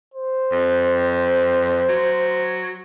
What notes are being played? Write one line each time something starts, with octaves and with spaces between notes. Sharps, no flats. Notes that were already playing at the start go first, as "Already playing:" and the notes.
C5
F2
F#3